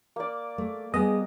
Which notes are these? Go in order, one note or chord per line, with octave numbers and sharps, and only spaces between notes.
A#3 D5
A3
G3 B3 G#4 D#5